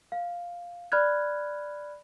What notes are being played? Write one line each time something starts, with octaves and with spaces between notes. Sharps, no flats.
F5
D5 B5 F6 F#6 G#6